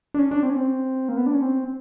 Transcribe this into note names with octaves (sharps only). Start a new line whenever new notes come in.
D4
C#4
D4
C4
C#4
C4
A#3
B3
D4
C#4
C4